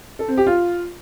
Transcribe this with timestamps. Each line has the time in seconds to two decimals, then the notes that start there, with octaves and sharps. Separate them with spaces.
0.19 A4
0.28 C4
0.37 G4
0.47 F4